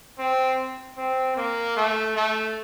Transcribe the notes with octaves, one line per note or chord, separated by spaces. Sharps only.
C4
C4
A#3
A3
A3